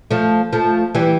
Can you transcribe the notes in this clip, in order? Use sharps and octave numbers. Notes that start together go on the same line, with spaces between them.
F3 A3
F3 A3
E3 G3